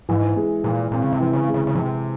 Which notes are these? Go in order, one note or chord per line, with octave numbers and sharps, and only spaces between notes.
G#2 E3
G#3
A#2 E3
A#2 C4
C#3
C3
E3
C#3
G#3
C#3
C#3
C3 E3